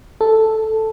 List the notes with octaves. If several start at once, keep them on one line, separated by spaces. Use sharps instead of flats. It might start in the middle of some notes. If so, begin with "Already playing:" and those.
A4